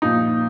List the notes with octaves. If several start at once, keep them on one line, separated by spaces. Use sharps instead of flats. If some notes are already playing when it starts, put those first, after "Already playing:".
A#2 F3 D#4